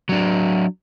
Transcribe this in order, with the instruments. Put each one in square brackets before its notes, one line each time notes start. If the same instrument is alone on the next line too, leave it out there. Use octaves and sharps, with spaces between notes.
[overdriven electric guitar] F#3 D4